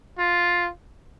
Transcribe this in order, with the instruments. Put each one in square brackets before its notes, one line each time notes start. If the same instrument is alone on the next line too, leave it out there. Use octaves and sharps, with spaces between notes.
[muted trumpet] F4